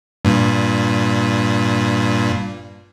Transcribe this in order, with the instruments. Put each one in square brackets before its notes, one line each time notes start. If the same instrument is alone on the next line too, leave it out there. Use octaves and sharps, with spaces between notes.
[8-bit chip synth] G2 A#2